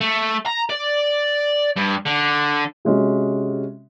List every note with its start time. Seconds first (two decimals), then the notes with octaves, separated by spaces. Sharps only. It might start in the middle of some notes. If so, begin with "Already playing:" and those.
0.01 A3
0.46 A#5
0.70 D5
1.77 G2
2.06 D3
2.85 C3 G#3 C#4 F#4